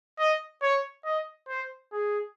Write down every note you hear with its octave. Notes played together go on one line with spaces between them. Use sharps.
D#5
C#5
D#5
C5
G#4